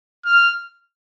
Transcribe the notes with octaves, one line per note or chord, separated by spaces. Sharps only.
F6